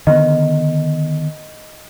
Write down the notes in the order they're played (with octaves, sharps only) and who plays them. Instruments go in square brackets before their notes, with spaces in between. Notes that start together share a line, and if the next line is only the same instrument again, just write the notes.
[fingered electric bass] D3 D#3 B3 [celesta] D#5